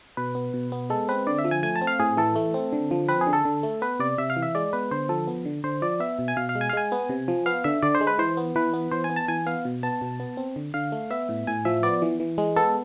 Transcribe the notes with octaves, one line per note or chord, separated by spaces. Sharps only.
B2 B4
B3
B2
B3
G#3 A4
C4 B4
D3 D5
E5
F3
G#5
A3 G#5
A5
C4
F5
A2 G#4
E3 A4
A3
C4
D3
F3
C4 B4
G#4
D3
A4
D3
A3
B3 B4
C3 D5
C3 E5
F5
E3
E5
G#3 D5
B3 B4
D3 C5
F3 A4
B3
D3
D3 C5
F3 D5
B3 E5
B2
G#5
B2 F5
F5
G#3
G#5
F5
G#3 G#5
B3
C3
F3
B3 F5
D3 E5
D3 D5
C5
G#3
B4
E3 C5
B3
E3 B4
B3
E3 C5
G#5
B3
A5
E3 G#5
B3 F5
B2
B3 A5
B2
B3
C4
D3
D3 F5
A3
B3 E5
A2
A2 G#5
F3 E5
B3 D5
E3
E3
G#3
B3 A4